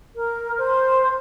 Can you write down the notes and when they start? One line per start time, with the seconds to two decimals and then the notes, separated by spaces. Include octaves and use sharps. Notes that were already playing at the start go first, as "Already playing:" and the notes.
0.16 A#4
0.58 C5